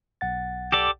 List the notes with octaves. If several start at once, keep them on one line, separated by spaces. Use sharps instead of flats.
B1 F#5 A6
G4 A4 D5